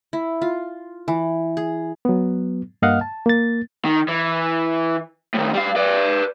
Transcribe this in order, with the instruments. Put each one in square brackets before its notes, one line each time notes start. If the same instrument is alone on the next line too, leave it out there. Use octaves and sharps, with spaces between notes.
[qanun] E4
F4
E3
G#4
[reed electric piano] F#3 B3
G2 A#3 D#5 F5 F#5 F6
A5
A#3 A6
[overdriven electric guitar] D#3
E3
A2 D#3
G3 F5
B4 D5